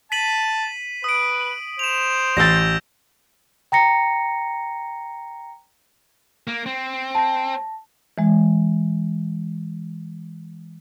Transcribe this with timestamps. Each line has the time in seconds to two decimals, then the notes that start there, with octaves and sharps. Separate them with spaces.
0.12 A5 B6 D#7 F#7
1.04 B4 D#6 D7
1.79 C5 E7 F7
2.37 A1 E6 G6 A6 A#6
3.72 G5 A#5 A#6 C#7
6.48 A#3
6.66 C4
7.15 A5 A#6
8.18 E3 G#3